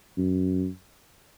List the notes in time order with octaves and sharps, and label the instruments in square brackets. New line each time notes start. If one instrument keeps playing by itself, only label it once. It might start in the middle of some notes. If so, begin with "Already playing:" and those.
[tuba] F#2